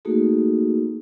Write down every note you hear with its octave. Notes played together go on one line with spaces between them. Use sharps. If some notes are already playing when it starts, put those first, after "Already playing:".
A3 A#3 D#4 F#4 G#4 A4